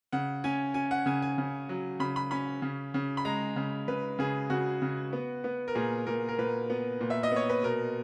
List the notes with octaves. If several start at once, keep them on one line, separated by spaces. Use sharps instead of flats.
C#3 F#5
C#4 G#5
C#4 G#5
F#5
C#3 G#5
G#5
C#3
F#3
C#3 B5
B5
C#4 B5
C#3
C#3
B5
G#3 A#5
C#3
C#3 B4
C#3 G#4
C#3 F#4
C#3
B3
B3
A#4
A#2 G#4
A#2 A#4
A#4
A#2 B4
B3
A#2
E5
D#5
B3 C#5
B4
B2 A#4